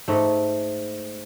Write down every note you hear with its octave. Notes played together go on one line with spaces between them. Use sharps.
G#2 A3